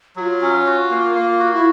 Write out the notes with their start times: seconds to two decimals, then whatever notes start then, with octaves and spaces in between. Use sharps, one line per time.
0.16 F#3 F#4
0.20 F4
0.42 C#4
0.66 F#4
0.90 A#3
1.15 A#3
1.39 F#4
1.53 E4